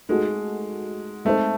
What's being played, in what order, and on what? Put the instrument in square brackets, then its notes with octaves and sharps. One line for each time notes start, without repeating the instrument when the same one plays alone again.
[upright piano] G#3 [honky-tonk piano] A3 D#4 F#4 A4
[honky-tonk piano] G#3 C4 D#4 A4 C5 [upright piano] A3